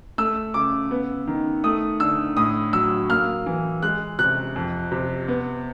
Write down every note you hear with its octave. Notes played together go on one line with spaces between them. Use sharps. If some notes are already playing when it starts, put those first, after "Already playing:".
A3 E6
C#3 D6
B3
D#3
A3 D#6
D3 E6
A2 D#6
F#3 E6
A#3 F6
E3
G#3 F#6
C3 F#6
F2
C3
B3